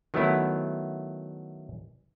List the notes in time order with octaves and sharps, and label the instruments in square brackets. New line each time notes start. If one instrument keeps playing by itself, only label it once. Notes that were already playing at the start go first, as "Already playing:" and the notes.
[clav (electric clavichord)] D#3 F#3 A3 B3 E4